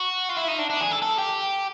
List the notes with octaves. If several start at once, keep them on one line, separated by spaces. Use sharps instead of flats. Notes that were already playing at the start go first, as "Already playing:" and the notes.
Already playing: F#4
F4
E4
D#4
D4
D4
G#4
A4
A4
G4